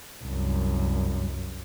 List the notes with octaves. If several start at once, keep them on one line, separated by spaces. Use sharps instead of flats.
C2 F#2